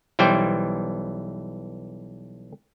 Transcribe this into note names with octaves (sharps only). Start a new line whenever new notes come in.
B1 E3 G3 C5 G5